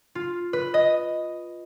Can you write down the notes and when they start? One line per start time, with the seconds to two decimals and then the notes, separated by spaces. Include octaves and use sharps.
0.15 F4
0.53 B4
0.74 D#5